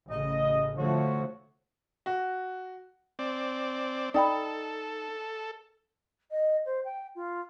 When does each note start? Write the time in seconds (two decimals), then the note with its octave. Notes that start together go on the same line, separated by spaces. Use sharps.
0.10 A1 C#3 D#5
0.76 D3 F3 A3 F4 F#4 C#5
2.06 F#4
3.19 C4 D5
4.14 D#4 A4 D5 G5 B5
6.31 D#5
6.65 C5
6.85 G5
7.15 F4